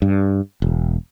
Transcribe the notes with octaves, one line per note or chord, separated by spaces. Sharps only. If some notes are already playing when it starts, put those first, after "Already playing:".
G2
E1